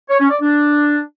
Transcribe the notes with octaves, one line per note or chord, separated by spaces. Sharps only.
C#5
C#4
D5
D4